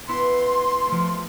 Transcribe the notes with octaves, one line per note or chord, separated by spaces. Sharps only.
B3 E4 C6
F3 A3